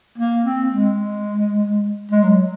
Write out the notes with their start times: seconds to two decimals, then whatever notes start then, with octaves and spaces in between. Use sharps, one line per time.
0.18 A#3
0.43 C4
0.70 G#3
2.12 G#3
2.24 F#3